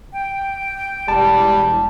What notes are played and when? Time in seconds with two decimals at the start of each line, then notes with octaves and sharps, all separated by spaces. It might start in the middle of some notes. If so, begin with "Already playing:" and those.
0.13 G5
1.08 E1 G3 A5